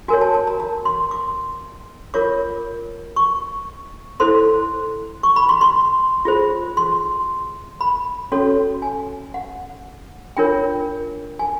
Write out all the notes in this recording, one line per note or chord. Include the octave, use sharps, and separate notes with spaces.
F#4 A#4 C#5 G#5
A5
A5
A#5
A#5
C6
D6
F4 A#4 C#5 D6
C#6
E4 A4 C5 C6
C#6
B5
C6
C6
F4 G#4 C5
C6
B5
C#4 F#4 A4 C#5
G#5
F#5
D4 F4 A#4 C#5 G5
G#5